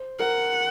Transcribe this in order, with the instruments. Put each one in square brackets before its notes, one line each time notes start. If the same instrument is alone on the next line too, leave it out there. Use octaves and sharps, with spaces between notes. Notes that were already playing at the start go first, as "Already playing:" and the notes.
Already playing: [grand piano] C5
[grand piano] A#4 [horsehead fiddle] F#5